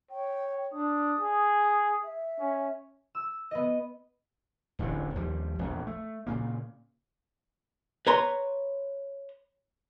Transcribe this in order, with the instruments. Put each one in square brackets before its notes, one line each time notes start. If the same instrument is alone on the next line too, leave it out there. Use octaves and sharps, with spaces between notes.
[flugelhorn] C#5 [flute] G5
[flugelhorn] D4 [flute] D#6
[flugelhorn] G#4
[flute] E5
[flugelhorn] C#4
[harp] E6
B3 D#5
[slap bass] D1 A1 E2 D3
D#2 F3 G3
E1 A#1 F2
A3
A#2 C#3 A#3
[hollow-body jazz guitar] B4 C#5 A#5 C6